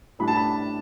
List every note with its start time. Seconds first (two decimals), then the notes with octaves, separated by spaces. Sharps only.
0.19 A2 G3 D4 B5
0.28 A5
0.37 B5